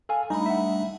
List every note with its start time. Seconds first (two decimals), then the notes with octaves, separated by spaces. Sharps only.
0.09 A4 F5 G#5
0.30 G3 A3 D4 D#4 B5
0.46 E5 F#5